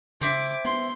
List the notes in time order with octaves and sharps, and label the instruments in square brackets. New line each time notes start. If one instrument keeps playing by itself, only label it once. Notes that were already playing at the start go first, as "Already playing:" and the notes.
[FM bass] C#3 [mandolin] C4 E4 [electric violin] D6
[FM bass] B3 [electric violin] C6